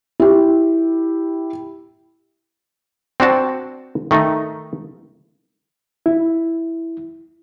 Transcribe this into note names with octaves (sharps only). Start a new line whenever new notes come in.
E4 G4
C4 D4 F#4 A5
D#3 A3 D#4
E4